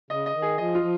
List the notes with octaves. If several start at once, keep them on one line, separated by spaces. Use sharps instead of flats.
C#3 D#5
D#5
D#3
G#4
F3 D#5
F4
F3